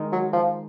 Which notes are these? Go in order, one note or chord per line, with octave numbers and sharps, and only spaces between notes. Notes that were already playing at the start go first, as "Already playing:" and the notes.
Already playing: D#3 G#3 D#4 A#4
F#3
F3